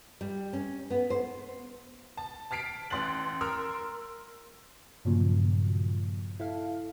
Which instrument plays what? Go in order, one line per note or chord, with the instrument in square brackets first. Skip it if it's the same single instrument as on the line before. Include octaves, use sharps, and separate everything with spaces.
[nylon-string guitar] G3
C#4
B3
C5
[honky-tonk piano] A5
A5 F6 B6 C7 D7
A1 C6 F#6 A6 F#7
A#4 C6 E6 F6
[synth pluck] G2 A#2 C#3 F3 F#3 A#3
E4 A4 F5